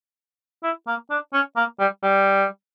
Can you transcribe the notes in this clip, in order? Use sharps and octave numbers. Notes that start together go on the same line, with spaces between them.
E4
A#3
D4
C#4
A#3
G3
G3